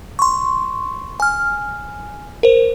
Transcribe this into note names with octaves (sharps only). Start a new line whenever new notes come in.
C6 C#6
G#5 F6
A#4 C5